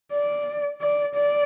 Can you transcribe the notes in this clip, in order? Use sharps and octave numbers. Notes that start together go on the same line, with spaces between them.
D5
D5
D5